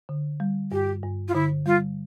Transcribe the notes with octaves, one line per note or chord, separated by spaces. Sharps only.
D3
G3
G2 G4
G2
F4
D3 E4
G3 F4